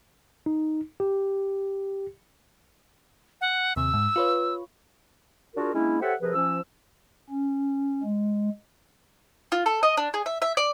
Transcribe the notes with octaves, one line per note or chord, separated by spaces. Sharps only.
D#4
G4
F#5
D#2 C3 E6
G#2
F4 B4 C#5
D4 F4 F#4 G#4 A#4
G#3 A#3 C#4 D4 E4
G4 A4 C5 C#5 E5 F#5
C3 F3 G#4 A#4 B4
F3 C#4 E6
C#4
G#3
F4
A4
D#5
D4
G#4
E5
E5
D5